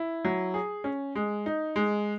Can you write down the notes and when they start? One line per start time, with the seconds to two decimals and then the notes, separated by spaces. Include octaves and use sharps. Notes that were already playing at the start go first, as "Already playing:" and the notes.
Already playing: E4
0.25 F#3
0.54 G#4
0.84 C#4
1.15 G#3
1.46 D#4
1.76 G#3